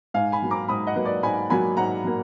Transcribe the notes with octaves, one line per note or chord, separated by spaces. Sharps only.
G#2 F5 G#5
G#5 B5
F#3 A#3
A#5 D6
G#2 B5 D#6
D#5 F#5
F#3 A#3 B4
D5
G#2 G#5 B5
F#3 A#3 G#5 B5
G#2 F#5 A#5
F#3 A#3